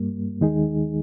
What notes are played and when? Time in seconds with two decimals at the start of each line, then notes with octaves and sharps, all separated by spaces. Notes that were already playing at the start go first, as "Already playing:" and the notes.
Already playing: G2 G3 A#3
0.41 D#2 D#3 G#3 D#4 G#4